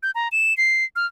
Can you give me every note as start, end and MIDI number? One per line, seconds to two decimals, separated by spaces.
0.03 0.11 91
0.15 0.28 82
0.32 0.56 100
0.57 0.84 96
0.96 1.06 89